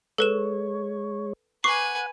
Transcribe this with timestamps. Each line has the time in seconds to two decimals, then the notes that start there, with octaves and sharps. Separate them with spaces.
0.18 G#3 A4 B4 C#5 E7
1.64 B4 F#5 G#5 C#6 D6 C7